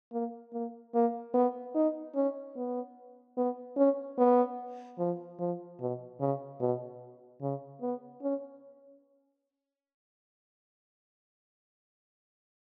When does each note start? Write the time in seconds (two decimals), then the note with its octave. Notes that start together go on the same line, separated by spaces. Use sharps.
0.13 A#3
0.53 A#3
0.94 A#3
1.34 B3
1.75 D#4
2.16 C#4
2.56 B3
3.37 B3
3.77 C#4
4.18 B3
4.99 F3
5.39 F3
5.80 B2
6.20 C#3
6.60 B2
7.42 C#3
7.82 B3
8.22 C#4